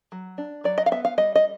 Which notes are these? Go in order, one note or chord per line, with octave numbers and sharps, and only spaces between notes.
F#3
D4
F#3 D5
D#5
F5
B3 E5
F5
G3 D#5
D#5